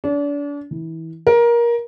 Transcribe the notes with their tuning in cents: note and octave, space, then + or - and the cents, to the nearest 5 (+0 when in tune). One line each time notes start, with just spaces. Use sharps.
D4 -35
E3 -25
A#4 +20